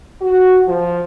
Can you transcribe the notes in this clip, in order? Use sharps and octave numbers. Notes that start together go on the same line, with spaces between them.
F#4
F3